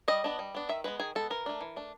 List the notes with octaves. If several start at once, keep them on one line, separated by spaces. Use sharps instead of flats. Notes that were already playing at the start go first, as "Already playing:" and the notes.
G3 D#5
B3 D4
G3
B3 D4
D#3 E5
G#3 B3 B4
D#3 G#4
G#3 B3 A4
E3 A#4
A3 D4
E3
A3 D4